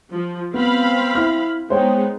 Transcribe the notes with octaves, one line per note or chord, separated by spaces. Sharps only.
F3
B3 C4 F5 B5
E4 F6
G#3 B3 D#4 C5 C#5 G5